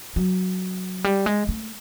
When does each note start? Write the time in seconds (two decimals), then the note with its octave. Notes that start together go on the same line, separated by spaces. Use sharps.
0.16 F#3
1.04 G3
1.26 G#3
1.49 A3